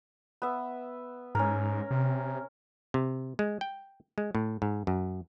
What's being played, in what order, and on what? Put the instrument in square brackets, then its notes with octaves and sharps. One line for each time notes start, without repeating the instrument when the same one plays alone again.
[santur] B3 E5
[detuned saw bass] G#2 [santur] C#4 A#4
[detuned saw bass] C3
[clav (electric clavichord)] C3
G#3
G5
G#3
A2
G#2
F#2